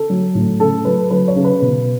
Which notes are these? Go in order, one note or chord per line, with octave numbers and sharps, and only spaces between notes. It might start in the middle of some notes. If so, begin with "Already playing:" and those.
Already playing: A4
F#3
A2
C#3 A4
F#3 B4
F#3 B4
C#5
C#3
B4
B2